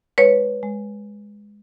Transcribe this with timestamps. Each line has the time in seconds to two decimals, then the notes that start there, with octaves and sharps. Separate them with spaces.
0.18 G#3 B4 C#5
0.63 G#3